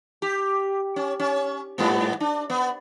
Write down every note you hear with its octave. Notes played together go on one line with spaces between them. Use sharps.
G4
C#4
C#4
G#2 G3 B3
D4
B3